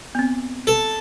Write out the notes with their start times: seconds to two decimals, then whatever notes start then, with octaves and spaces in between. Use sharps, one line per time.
0.15 B3 C4
0.67 A4